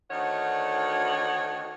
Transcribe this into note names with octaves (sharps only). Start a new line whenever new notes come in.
D2 D#3 F#4 C#5 F#5